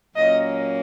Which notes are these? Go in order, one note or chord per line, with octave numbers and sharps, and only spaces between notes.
A#2 F#3 A#3 C#4 D#5